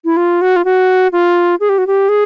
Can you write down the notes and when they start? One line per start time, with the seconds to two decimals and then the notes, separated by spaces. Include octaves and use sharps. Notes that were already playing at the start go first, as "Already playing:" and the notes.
0.05 E4
0.17 F4
0.41 F#4
0.56 F4
0.65 F#4
1.12 F4
1.60 G#4
1.69 G4
1.78 F#4
1.87 G4
2.09 G#4